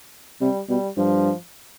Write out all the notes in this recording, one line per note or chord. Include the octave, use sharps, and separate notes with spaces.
C3 G3
B2 G3
G2 F3